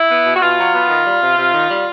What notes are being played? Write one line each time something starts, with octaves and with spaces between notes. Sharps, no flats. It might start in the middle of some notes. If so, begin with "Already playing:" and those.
Already playing: E4
B3
B2
F#4
B2 F4
F#3
B3
D#3
G3
C3
C3
D#3
G3